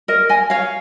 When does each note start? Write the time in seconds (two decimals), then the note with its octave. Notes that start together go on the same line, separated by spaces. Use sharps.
0.08 A#4 D#5
0.29 D#5 G#5
0.50 C#5 F5